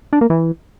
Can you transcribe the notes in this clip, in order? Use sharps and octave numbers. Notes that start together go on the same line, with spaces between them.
D4
A#3
E3